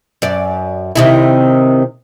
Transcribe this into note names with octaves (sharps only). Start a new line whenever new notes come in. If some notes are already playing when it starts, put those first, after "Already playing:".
F#2 D5
C3 D#3 E4